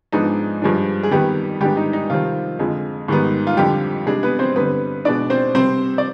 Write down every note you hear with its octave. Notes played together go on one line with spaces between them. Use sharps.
G#2 F3 G#3 B3 D4 D#4
G2 F3 G#3 D4
G#4
F2 D#3 G3 B3 G4
G#2 D#3 G3 B3 D4 G4
D#4
D#4
C3 D#3 F3 G3 C4 F4
F2 D3 G#3
G#2 D#3 G3 B3
F4
F2 D3 F3 G3 G4
C3 G3 G#3 D4 G#4
B3 B4
C4 C5
G2 D3 G3 B3 C4 B4
B2 G#3 B3 D4 D5
C4 C5
C3 G3 C4 C5
D5